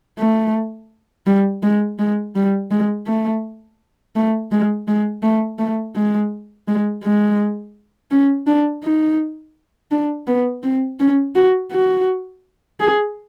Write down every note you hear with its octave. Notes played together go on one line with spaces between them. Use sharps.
A3
G3
G#3
G#3
G3
G#3
A3
A3
G#3
G#3
A3
A3
G#3
G#3
G#3
C#4
D4
D#4
D4
B3
C4
C#4
F#4
F#4
G#4